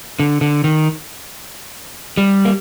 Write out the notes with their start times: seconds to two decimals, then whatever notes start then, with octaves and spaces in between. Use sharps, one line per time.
0.19 D3
0.41 D3
0.64 D#3
2.17 G3
2.45 A#3